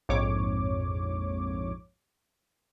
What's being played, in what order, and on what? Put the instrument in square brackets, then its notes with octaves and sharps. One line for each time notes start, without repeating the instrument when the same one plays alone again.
[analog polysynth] A#1 F2 G#2 C#5 D6